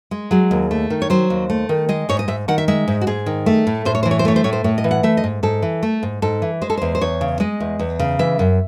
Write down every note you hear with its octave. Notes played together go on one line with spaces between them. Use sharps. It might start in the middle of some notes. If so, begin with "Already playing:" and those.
G#3
F#3 G#4
D#2
A3
D#3
C#5
F#3 C5
D#2
A3
D#3
G#3 D#5
G#2 C#5
D#5
G#2 E5
D#3 F#5
E5
G#3 E5
G#2
F#4
G#2 G#4
D#3
A3
A2
A2 C5
C#5
E3 C5
C#5
C5
A3 C#5
C5
A2 C#5
C5
A2 C#5
D#5
E3
F#5
A3 E5
D#5
G#2
G#2 A4
E3
A3
G#2
G#2 A4
E3
G#3 C5
A4
E2 C5
C5
E2 C#5
C#3
G#3 D#5
E2
E2
C#3
E3 E5
F#2